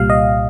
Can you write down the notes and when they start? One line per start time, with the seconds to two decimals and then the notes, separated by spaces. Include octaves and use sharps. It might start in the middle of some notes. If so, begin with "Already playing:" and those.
Already playing: C2 A#2 G3 F5
0.10 D#5